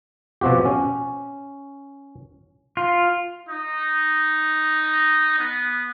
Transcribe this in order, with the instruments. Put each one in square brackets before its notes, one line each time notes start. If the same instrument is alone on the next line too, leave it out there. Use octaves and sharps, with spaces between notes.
[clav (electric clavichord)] B2 F3 C4 F#4 G4
C#4
[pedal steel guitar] F4
[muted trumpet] D#4
B3